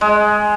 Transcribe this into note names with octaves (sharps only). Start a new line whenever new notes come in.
G#3